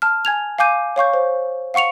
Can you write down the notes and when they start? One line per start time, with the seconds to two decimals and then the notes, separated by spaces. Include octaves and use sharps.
0.02 A5 F6
0.25 G#5 G#6 F7
0.59 F5 G#5 D6 G6 D#7
0.96 C#5 F5 C#6 G6
1.14 C5
1.74 F5 F#5 C#6 C#7 F7